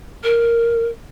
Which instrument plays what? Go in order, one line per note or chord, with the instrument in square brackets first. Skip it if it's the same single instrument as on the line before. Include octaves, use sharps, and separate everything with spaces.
[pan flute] A#4